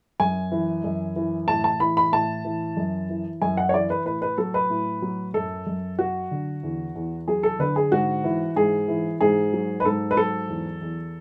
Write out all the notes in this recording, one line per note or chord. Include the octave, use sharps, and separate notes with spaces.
F#2 G#5
E3
F#2
E3
A2 A5
A5
E3 B5
B5
A2 A5
E3
F#2
E3
F#2 G#5
F#5
C#5
E3 D5
B4
A2 B4
B4
F#3 A4
B4
A2
F#3
F#2 A4
F#2
F#3 F#4
D3
E2
E2
F#3 G#4
A4
D3 B4
G#4
G#2 F#4
E3
G#2 G#4
E3
G#2 G#4
F#3
B4
G#2 A4
B4
F#3 A4
E2
E2